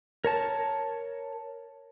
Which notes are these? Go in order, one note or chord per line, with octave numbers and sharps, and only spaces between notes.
A#4 C#5 A5